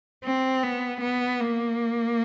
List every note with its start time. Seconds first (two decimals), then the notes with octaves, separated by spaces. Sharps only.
0.24 C4
0.63 B3
1.01 B3
1.40 A#3